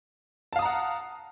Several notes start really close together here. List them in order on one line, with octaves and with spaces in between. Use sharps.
A5 F5 D#6 A#5 F#5